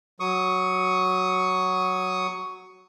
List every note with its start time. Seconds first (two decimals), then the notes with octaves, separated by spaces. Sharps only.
0.20 F#3 C#6 D#6